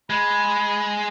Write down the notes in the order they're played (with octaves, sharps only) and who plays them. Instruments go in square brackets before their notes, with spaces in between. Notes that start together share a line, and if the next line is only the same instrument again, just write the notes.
[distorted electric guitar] G#3 [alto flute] B5